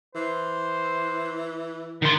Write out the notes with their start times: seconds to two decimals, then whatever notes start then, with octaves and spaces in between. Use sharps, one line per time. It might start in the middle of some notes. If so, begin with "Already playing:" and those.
0.15 E3 C5
2.02 D#3 B3 C6